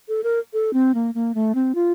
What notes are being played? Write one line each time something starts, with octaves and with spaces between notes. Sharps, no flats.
A4
A#4
A4
C4
A#3
A#3
A3
C4
F4